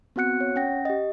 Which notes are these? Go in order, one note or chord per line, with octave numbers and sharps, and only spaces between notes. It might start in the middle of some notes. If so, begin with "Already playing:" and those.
B3 C4 F#4 F#5 F#6 C#7
C#5
C#4 F#5 G5 A#6
G4 D#5